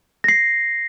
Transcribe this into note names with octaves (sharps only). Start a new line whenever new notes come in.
A#6 C7